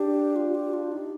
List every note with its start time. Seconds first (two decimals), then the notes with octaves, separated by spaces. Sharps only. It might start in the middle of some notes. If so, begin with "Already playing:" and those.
Already playing: D4 G4
0.36 F4
0.55 G4
0.74 F4
0.92 D#4